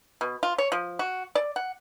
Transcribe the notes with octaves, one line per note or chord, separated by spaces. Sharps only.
B2
F4
C#5
F3
F#4
D5
F#5